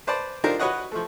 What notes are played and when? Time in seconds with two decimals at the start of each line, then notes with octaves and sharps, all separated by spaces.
0.07 B4 C5 D5 A5
0.44 D4 D#4 F4 G4 A#4 C5
0.59 F#4 B4 C#5 D#5 F#5
0.92 F3 A3